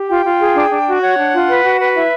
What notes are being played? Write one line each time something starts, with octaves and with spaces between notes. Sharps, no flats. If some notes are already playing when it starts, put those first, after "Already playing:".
Already playing: G4
F4 G5
F4
G#4
D4
D4
F#4
C#5 F#5
D4
F4
B4
F#4
B4
E4 E5